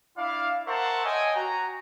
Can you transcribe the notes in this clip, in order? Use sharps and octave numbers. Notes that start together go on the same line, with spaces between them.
D4 E4 D5 E5 F5
A#4 C5 E5 F#5 A5 C#6
C#5 D#5 G5 G#5
F#4 A#5